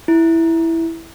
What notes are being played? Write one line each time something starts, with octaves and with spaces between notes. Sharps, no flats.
E4